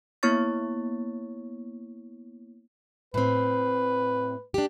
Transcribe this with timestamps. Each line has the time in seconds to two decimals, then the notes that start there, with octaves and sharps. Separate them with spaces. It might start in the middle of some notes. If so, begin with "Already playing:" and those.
0.23 A#3 B3 E4 C#5 C#6 A6
3.14 A2 C4 B4
4.54 D4 G4